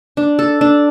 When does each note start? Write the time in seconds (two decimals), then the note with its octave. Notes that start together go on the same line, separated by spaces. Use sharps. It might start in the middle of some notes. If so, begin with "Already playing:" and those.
0.17 D4
0.39 A4
0.61 D4